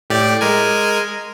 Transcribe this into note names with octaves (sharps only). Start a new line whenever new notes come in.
A2 G4 D5
G#3 A#4 G#5